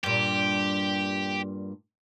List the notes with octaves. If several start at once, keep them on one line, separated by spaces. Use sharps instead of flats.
G2 A#2 G4